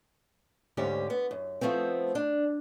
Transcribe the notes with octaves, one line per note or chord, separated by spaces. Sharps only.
D2 G#2 D3 C#4 G4
B3
F#2
F3 A3 B3 C4
D4